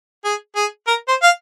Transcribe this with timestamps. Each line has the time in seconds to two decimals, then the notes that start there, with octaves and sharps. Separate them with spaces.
0.25 G#4
0.56 G#4
0.88 A#4
1.08 C5
1.22 F5